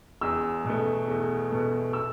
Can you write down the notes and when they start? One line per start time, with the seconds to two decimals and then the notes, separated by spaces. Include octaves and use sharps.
0.21 E2 E6
0.65 B2 A3
1.08 E2
1.51 B2 A3
1.93 E6